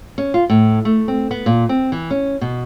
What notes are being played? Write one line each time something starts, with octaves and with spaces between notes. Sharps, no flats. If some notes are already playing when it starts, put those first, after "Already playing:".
C#4
F4
A2
A3
C4
B3
A#2
C4
E3
C#4
B2